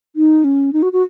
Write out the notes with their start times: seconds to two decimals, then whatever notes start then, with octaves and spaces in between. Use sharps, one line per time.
0.16 D#4
0.44 C#4
0.73 D#4
0.82 F#4
0.93 F#4